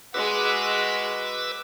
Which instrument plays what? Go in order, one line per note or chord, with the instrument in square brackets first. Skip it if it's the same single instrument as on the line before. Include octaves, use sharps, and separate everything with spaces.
[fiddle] G#3 F#4 [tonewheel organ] B4 D6 E6